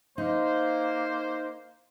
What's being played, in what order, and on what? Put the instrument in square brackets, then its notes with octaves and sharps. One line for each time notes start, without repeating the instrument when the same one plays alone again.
[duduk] A#3 [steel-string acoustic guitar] D#4 [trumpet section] C5